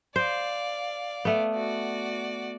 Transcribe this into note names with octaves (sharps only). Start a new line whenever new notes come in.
C5 D5 F5
A3 B3
F#4 D5